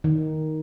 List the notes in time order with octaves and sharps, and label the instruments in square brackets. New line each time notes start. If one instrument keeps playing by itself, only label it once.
[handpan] D#3